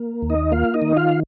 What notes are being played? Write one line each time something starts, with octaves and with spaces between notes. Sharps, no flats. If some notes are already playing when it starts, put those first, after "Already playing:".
Already playing: A#3
D#2
D#4 D#5
A#3 F4 F5
D#4 D#5
D#3
F4 F5